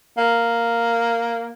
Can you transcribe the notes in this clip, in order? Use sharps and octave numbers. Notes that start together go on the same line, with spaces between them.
A#3